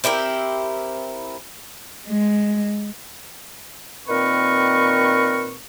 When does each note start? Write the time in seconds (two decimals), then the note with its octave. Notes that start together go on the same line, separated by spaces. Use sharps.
0.04 C4 E4 G4 A#4
2.07 G#3
4.08 A#2 D#3 C4 A#4 B4 C#6